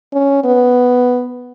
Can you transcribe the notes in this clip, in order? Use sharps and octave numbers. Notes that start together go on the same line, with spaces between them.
C#4
B3